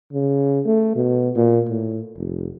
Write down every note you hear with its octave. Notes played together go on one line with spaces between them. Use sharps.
C#3
A3
B2
A#2
A2
F1